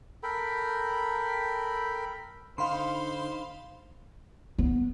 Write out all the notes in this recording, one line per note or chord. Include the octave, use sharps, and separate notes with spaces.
A4 A#4 G5 B5
D3 D#4 C5 F5 B5 C6
B3